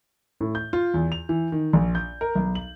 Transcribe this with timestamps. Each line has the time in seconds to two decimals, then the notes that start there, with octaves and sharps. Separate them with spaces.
0.41 A2
0.55 G6
0.73 F4
0.94 E2
1.12 F7
1.29 E3
1.52 D#3
1.73 A#1
1.95 G6
2.21 A#4
2.35 B1
2.55 F#7